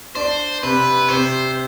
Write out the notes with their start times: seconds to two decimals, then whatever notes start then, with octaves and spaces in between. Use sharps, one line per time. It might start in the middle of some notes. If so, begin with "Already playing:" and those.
0.15 D4 C5
0.63 C3 B4
1.09 C3 C5